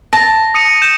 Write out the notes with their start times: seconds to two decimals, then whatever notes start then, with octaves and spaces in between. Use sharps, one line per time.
0.13 A5 A#6
0.54 D#6 C#7 D#7
0.82 G6 E7